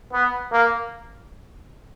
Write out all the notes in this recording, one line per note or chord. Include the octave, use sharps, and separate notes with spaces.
B3
A#3